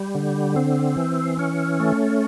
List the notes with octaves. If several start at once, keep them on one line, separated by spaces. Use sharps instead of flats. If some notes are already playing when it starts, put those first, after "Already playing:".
Already playing: G3
D3
C4
E3
C#4
A3